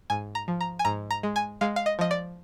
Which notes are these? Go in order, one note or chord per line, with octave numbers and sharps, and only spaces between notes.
G#2 G#5
A#5
F3
A#5
G#5
G#2 A#5
A#5
G#3
G#5
G#3 F5
F5
D#5
F3 D#5
D5